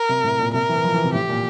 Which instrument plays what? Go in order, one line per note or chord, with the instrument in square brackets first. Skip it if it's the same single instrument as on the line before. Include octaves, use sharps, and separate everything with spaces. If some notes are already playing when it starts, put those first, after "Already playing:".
Already playing: [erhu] A#4
[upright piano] C3
A2
A#2
[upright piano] C3 [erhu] A#4
[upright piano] E3
F3
E3
C3
[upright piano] A2 [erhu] G4
[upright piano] A#2